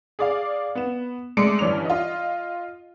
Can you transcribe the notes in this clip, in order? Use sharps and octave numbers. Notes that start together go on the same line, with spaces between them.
G#4 D5 F5
B3 E7
G#3 A3 D5 C#7 D7
G2 E3 C#4 D4 F7
F4 D#5